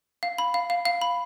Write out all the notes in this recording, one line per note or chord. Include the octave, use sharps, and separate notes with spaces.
F5
B5
F5
F5
F5
B5